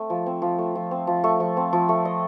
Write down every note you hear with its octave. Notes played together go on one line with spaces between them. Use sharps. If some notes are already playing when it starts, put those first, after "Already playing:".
Already playing: A3 C4
F3
C4
F3
A3
F3
C4
F3
A3
F3
C4
F3
A3
D#5